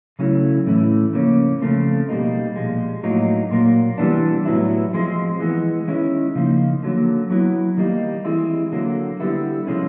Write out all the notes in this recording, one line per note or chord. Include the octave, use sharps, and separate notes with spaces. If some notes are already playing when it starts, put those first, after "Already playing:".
C#3 F#3 A3 C#4 E4
A2 E3 A3 C#4 E4
C#3 F3 A#3 C#4
C#3 F3 A3 C4
B2 G3 A#3 D#4
A#2 F3 G#3
A2 F#3 A#3 D#4
A#2 F#3 A#3
C3 E3 G3 B3 D4
A2 F#3 B3 E4
F3 G#3 C4
E3 G#3 B3
D#3 G#3 C#4 E4
C#3 F3 A#3 D#4
D3 F#3 A#3
F#3 B3 E4
D#3 G3 A#3 D#4
E3 G#3 C4 E4
D3 F#3 A#3
D3 G3 B3 E4
C3 F3 G#3 C#4 E4